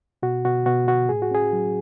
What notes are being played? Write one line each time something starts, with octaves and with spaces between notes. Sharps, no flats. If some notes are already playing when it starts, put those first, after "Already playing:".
B2 F#4
B2 F#4
B2 F#4
B2 F#4
A2 G#4
F#4
C#4 G#4
F#3